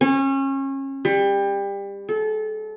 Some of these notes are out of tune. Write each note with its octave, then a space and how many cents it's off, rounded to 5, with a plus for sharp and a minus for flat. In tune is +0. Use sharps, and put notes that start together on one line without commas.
C#4 -30
G3 +25
A4 -30